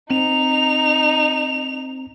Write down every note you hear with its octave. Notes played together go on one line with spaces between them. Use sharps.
C4 D#4 F7